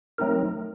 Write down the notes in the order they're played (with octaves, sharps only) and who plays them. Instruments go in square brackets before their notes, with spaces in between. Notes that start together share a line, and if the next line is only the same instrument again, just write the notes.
[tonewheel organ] F#3 A3 C4 D#4 A#4